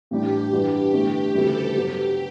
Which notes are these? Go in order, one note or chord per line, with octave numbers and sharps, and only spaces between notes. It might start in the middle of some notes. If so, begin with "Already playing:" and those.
A1 A2 G3 D4 G4
G2 E3 G3 D4 F#4
G1 G2 E3 A3 D4 G4
D2 C#3 E3 G3 A4
G2 F#3 B3 F#4 G4